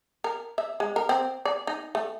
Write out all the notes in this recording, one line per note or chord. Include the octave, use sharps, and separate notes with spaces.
A#4
E5
G#3
A#4
C4
D5
D#4
A3